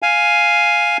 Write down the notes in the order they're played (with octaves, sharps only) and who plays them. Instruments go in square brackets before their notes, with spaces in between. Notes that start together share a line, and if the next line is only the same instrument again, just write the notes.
[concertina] F5 G#5